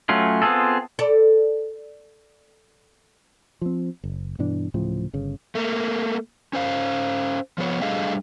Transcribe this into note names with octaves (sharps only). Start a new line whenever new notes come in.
F#3 A3 C#4 F4
B3 C4 F4 G#4 A4
A4 D5
F3 C4
F#1
G2 B2 E3 D4
D1 A2 C#3 F3
G1 C#3
A3 A#3
C#4 C5 F5
F3 B3 C#5
G3 A3 D4 G#4 D#5 F5